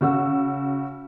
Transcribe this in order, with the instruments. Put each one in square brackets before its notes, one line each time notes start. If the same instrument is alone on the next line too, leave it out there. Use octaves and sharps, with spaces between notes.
[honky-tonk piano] C#3 F#4 E6